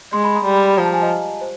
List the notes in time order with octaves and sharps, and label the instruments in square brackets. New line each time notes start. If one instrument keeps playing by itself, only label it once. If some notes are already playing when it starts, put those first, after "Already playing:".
[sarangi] G#3 [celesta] C6
[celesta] B5
A#5
[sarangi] G3 [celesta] B5
[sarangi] F3 [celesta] A#5
[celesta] A5
G#5
D#5
C5